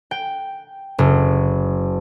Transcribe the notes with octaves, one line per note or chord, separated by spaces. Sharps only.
G5
F#1